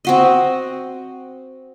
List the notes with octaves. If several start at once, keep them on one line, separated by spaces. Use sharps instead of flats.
C4 F#4 D#5